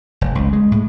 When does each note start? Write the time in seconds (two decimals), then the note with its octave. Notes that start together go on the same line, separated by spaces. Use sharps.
0.21 F1
0.35 C#2
0.53 G#3
0.72 A2